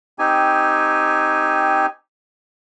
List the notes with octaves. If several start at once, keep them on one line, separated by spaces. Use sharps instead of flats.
C4 D#4 G4 G#5